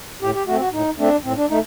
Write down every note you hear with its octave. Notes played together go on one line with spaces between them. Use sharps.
A2 G4
G4
A3 C4 F#4
F#4
A2 D#4
A3 C4 D4
A2 C4
D4
A3 D#4